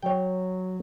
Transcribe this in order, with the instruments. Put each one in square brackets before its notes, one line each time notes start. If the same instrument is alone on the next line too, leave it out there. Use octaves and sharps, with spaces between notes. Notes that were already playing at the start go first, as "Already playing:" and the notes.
[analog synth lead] F#3 [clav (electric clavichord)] C#5 G5